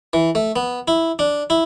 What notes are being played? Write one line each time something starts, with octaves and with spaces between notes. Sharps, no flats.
E3
A3
B3
E4
D4
E4